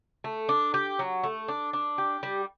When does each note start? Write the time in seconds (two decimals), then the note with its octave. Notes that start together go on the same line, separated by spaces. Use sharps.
0.24 A3
0.49 D4
0.74 G4
0.99 F#3
1.23 A3
1.48 D4
1.73 D4
1.98 G4
2.23 G3